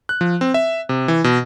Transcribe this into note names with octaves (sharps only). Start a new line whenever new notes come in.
F#6
F3
C4
E5
C3
E3
B2